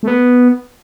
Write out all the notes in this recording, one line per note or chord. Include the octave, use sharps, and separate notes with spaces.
A3
B3